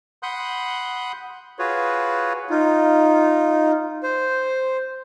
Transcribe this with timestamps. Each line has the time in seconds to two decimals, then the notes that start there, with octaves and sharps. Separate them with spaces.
0.23 F#5 B5 C6 D#6 F#6 G6
1.59 F4 F#4 G#4 B4 C#5
2.50 D#4 F4
4.03 C5